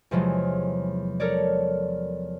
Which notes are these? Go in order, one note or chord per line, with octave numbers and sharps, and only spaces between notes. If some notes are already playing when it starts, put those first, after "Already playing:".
E2 C3 F3 F#3 G#3
A4 A#4 C#5 D5